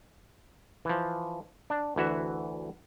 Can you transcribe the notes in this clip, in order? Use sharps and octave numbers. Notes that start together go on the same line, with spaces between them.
E3 F3
D4
D2 E3 F#4 E5